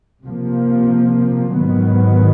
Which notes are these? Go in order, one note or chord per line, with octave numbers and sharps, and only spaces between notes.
C3 F3 A#3
G#2 D#3 F#3 B3